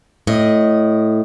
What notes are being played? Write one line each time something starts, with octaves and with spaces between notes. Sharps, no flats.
A2 D#5